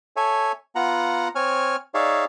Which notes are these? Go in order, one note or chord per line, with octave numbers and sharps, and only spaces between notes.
A4 C#5 E5 G#5
B3 F4 F#5 A#5
C4 C#5 G#5 F6
D#4 G#4 C#5 D5 E5 F5